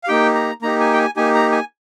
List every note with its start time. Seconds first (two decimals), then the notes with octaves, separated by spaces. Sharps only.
0.04 F5
0.08 A#3 D#4 G4 G5
0.35 A#5
0.62 A#3 D#4 G4 A#5
0.80 G#5
0.93 G5
0.98 G#5
1.16 A#3 D#4 G4 G#5
1.35 A#5
1.52 G#5